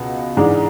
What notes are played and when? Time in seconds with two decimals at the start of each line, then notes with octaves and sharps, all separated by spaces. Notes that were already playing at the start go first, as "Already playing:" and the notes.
Already playing: C#2 B2
0.37 G#2 E3 G#3 D4